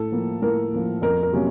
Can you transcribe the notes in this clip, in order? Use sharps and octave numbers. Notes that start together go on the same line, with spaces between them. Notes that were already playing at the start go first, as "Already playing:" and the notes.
Already playing: A2 A4
F3 A#3
A2 A#4
F3 A#3
F2 A#4
A#4
C3 F#3 A#3 C#4